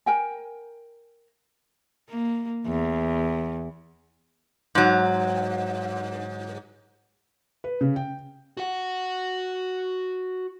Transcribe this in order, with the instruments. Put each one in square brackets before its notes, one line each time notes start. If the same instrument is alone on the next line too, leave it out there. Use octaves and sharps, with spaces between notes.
[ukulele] A#4 G5 G#5
[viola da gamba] A#3
E2
[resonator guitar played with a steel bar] G#2 F#3
[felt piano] B4
C#3
G5
[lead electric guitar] F#4 F#5